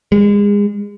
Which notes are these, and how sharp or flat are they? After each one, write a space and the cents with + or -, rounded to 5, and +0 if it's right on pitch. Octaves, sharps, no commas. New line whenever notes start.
G#3 -30